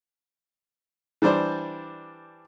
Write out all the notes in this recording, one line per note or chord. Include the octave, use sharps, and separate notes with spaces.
E3 G3 D4 C5 D5